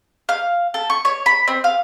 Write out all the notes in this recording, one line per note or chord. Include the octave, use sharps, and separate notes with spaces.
F5
A4
C#6
C#5
B5
C4
F5